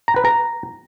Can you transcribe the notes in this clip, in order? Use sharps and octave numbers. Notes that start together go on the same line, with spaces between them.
A#5
B4
A#5